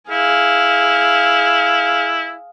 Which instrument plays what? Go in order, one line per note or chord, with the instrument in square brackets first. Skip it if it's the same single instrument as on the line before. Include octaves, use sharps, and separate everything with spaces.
[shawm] E4 [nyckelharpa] G#4 F5